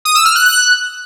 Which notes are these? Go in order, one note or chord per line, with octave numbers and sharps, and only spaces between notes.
D#6
E6
F6
F#6
F#6